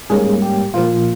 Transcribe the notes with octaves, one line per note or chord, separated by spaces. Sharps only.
G#2 G3 A#3 C#4 G#4
G4
A#2 F3 A#3 F4